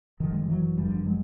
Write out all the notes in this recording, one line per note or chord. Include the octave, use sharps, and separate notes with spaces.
G1 F#2 D3 D#3 F3
G#3
G3
E3 F#3
G1 F#2 D3 F3 G3
F#3 G#3